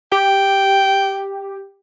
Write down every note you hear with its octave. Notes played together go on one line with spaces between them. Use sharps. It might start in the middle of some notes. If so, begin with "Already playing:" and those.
G4 G5